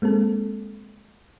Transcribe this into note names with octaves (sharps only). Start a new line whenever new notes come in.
G#3 A#3 C4 A4